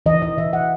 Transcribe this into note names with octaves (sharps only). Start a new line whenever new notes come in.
E3 D#5
D#5
E3 E5
F#5